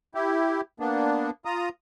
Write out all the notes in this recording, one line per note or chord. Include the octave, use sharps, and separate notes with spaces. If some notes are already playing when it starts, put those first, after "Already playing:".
E4 G4
A#3 B3 D4
F4 A#5 D#6